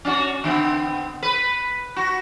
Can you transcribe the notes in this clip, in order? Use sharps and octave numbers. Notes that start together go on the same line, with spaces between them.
C#4 D4 F#4
D3 B3 C4
B4
F#4